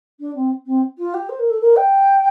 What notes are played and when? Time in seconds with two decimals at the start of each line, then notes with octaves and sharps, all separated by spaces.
0.19 D4
0.35 C4
0.66 C4
0.98 F4
1.13 G4
1.29 C5
1.39 A#4
1.49 A4
1.60 A#4
1.76 G5